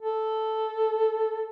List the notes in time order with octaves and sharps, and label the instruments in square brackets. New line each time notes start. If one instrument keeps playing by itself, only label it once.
[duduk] A4